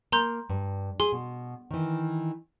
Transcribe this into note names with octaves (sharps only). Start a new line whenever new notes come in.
A#3 A#5 C6 G6
G2
G#4 C6
B2
D#3 E3